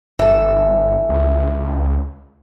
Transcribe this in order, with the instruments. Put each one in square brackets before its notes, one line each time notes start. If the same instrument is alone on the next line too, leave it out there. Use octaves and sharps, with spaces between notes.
[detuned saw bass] G1 [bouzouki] E3 A4
[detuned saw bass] C#2